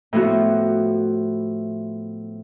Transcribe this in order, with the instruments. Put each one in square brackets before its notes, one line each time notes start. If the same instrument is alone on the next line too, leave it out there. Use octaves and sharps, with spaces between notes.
[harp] A2 F3 B3 F#4